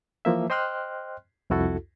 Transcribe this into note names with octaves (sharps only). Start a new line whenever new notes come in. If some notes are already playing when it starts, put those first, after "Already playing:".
E3 F3 A#3 E5
C5 D#5 G5 C6 F6 F#6
C2 F2 E4 F#4 A4